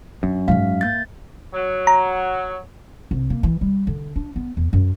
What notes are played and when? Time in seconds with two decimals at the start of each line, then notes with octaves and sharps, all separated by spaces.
0.23 F#2 D4
0.48 D1 G#2 F5
0.81 A#3 G6 A6
1.54 F#3
1.87 A#5
3.11 C2
3.30 A#3
3.43 E3
3.61 G3
3.87 D3
4.16 D4
4.36 B3
4.57 E2
4.73 F#2